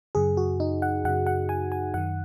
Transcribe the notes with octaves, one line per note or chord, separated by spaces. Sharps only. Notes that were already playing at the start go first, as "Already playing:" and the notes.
F#2 C#3 G#4
F#4
D#4
F#5
F#2 C#3 F#5
F#5
G#5
G#5
F#2 D#3 F#5